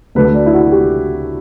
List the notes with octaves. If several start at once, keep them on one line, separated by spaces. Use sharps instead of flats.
D2 D3 F#3 A3 B4
D5
E4
F#4
G4